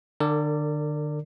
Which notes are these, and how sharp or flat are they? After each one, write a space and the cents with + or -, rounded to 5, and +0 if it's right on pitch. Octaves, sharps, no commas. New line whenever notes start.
D3 +35 A#4 -40 D5 +0